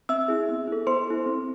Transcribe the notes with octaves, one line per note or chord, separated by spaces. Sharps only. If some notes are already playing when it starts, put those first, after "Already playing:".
C4 E5 E6
E4 G#4
B3
E4 A4
B3 C5 C6
E4 A4
C4